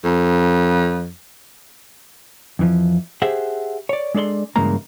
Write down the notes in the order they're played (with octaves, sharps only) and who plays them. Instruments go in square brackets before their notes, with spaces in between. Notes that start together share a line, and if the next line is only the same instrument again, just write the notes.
[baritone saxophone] F2
[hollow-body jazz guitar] F2 E3 F3
G4 G#4 C5 E5 F#5
C#5 D5
G#3 D4 A4 D5 C6
G2 C#3 E3 G#3 A#3 A#5